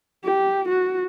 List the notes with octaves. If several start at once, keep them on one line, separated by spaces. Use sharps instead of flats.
G4
F#4